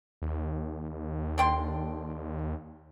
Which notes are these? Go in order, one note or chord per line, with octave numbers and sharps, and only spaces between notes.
D#2
D3 G5 C6